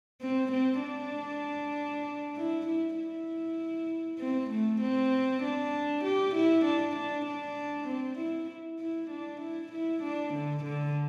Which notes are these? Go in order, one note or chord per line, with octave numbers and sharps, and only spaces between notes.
C4
C4
D4
E4
E4
E4
C4
A3
C4
D4
G4
E4
D4
D4
D4
C4
E4
E4
D4
E4
E4
D4
D3
D3